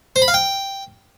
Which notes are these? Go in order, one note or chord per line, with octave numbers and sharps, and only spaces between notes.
C5
B5
F5
G5